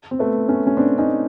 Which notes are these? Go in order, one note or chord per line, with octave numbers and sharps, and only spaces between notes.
C4
A3 B3
B3 C#4
C#4
C4 D4
C#4 D#4